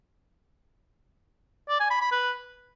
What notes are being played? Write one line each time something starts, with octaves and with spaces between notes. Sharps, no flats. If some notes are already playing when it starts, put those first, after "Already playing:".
D5
G#5
B5
B5
B4